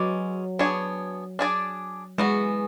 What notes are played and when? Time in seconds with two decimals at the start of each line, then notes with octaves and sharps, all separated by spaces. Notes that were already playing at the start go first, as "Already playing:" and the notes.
Already playing: F#3 G#3 C#4 B4 D5
0.59 B3 D4 G#4 C#5
1.39 D4 G#4 D5
2.18 E3 G#3 B3 F#4